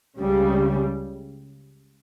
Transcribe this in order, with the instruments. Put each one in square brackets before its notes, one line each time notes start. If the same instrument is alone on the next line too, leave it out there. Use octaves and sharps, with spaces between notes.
[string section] C#2 C#3 G3